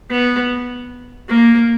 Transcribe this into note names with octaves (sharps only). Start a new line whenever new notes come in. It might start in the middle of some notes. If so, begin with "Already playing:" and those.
B3
A#3